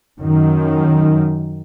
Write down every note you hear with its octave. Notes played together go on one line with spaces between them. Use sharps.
F#2 D#3